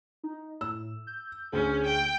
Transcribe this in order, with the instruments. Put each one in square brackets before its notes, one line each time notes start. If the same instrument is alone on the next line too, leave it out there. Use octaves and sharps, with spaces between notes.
[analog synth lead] D#4
[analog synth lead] A2 [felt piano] E6
[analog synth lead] G6
[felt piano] D2 [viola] C#4 [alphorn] G#4
[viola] G5